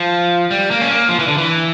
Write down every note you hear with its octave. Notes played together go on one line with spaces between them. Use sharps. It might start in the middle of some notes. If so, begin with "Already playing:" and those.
Already playing: F3
G3
A#3
C#4
A#3
F3
E3
D3
E3